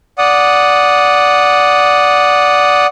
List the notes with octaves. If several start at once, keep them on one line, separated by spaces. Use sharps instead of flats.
D5 F#5 D#6